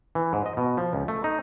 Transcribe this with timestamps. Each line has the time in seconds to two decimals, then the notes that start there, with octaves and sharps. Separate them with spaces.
0.15 E3
0.33 G#2
0.46 D#5
0.57 B2
0.78 F3
0.93 C#2
1.08 A3
1.24 D#4